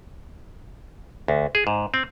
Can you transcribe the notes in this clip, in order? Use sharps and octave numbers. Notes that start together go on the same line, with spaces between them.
D2
G#4
G#2
C4